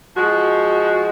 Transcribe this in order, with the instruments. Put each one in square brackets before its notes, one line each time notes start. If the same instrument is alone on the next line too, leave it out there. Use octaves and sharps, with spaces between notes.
[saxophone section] F3 G#3 F#4